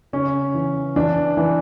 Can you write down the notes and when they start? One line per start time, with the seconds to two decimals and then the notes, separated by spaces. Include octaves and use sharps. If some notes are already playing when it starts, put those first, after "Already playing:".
0.13 C#3 C#4
0.54 E3
0.96 E3 D4
1.37 E3